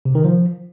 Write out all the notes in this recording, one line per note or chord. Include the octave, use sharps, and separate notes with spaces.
C3
D#3
F3